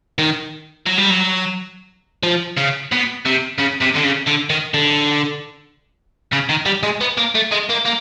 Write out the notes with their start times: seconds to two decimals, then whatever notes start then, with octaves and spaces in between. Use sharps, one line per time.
0.18 D#3
0.86 F#3
0.98 G3
1.10 F#3
2.23 F3
2.57 C#3
2.92 B2
3.26 C3
3.59 C#3
3.82 C3
3.96 D3
4.04 C#3
4.27 D3
4.50 D#3
4.74 D3
6.33 C#3
6.49 D#3
6.66 G3
6.83 G#3
7.01 B3
7.17 A#3
7.35 A3
7.51 G#3
7.69 A#3
7.85 A#3